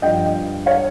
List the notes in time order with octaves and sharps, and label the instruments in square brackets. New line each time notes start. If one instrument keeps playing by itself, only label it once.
[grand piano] G2 F3 D#5 G5
C#5 F5